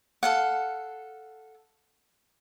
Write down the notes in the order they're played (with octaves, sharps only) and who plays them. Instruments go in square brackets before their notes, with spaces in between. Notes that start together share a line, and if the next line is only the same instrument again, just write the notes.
[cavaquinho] A4 F5 F#5